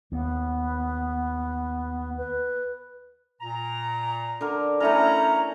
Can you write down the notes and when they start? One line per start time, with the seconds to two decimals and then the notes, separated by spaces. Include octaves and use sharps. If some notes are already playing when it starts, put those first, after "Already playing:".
0.12 D#2 B3
2.18 B4
3.41 A#2 A#5
4.41 D3 A#4
4.80 A3 C#4 E4 A#4 A#5